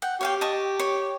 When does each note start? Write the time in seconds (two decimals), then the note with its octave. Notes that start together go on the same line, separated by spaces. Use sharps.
0.02 F#5 G5
0.21 G4 C#5 F5 G5
0.41 D#5 A5 C#6
0.79 C#5